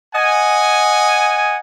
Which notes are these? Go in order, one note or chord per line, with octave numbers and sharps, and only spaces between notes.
D#5 F#5 G#5